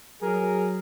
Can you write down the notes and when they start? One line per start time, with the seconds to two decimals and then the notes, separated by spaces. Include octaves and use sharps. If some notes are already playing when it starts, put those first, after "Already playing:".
0.22 F#3 G#4 A#4